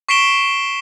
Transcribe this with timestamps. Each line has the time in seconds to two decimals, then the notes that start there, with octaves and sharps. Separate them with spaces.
0.09 C#6 B6 C7 D7 E7 G7